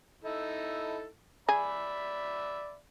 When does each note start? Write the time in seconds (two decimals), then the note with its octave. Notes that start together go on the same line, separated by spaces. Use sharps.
0.24 D#4 E4 A4
1.49 G#4 D5 E5 B5